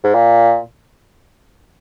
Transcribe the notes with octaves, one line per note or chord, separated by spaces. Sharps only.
G#2
A#2